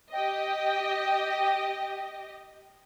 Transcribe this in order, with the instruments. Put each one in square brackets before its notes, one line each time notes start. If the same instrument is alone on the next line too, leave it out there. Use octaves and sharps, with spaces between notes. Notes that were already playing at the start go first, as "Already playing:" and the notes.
[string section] G4 D#5 [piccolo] G5